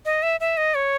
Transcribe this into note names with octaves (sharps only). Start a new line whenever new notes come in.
D#5
E5
E5
D#5
C#5